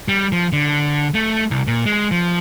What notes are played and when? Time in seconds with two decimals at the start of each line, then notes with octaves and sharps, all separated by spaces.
0.08 G3
0.32 F3
0.52 D3
1.14 A3
1.51 C2
1.67 A#2
1.86 G#3
2.11 F3